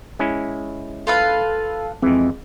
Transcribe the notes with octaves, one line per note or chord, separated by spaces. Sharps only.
G#3 C#4 E4
F4 A4 B4 F5
F2 E3 G#3 C4